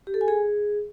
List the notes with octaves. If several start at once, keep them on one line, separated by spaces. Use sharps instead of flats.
G4
A4
G#5
G#4